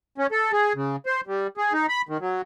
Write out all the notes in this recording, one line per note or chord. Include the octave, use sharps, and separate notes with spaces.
C#4
A4
G#4
C#3
C5
G3
G#4
D#4
B5
D#3
F#3